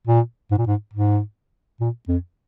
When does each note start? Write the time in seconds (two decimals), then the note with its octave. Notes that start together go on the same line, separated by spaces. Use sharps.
0.07 A#2
0.51 G#2
0.58 A#2
0.67 G#2
0.93 G#2
1.81 A#2
2.08 F2